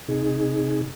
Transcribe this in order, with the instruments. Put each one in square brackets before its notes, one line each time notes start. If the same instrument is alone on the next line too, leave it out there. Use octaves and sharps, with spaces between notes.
[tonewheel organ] C3 D#4 G#4